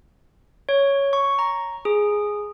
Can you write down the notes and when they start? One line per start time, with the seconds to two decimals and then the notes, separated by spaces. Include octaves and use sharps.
0.69 C#5
1.13 C#6
1.39 A#5
1.85 G#4